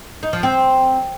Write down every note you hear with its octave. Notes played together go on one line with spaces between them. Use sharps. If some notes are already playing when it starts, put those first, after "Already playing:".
D#4
F3
C4